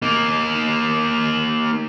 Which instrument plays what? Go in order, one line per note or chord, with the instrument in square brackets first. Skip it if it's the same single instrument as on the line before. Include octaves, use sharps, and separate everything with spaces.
[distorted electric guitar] A#3 D#4